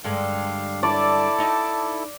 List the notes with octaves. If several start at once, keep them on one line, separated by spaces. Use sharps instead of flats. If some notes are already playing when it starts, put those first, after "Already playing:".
G2 D3 G#3 D4 F5
E4 A4 D5 A5
D#4 F#4